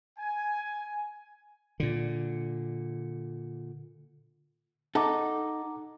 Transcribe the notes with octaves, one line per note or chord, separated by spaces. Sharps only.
G#5
A#2 D3
D#4 A4 F#5 A#5 D6